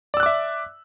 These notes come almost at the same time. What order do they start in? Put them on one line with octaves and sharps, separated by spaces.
D5 E6 F#6 D6 E5